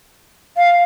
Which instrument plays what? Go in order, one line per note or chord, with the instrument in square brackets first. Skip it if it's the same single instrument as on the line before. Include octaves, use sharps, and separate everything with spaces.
[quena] F5